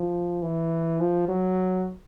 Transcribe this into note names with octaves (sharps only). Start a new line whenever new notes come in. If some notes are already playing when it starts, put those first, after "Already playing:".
Already playing: F3
E3
F3
F#3